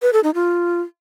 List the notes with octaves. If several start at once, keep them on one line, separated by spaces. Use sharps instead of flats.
B4
A4
D#4
F4